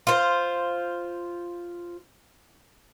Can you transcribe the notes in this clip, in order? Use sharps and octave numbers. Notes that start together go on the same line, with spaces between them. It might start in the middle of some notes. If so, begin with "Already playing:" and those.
F4 C5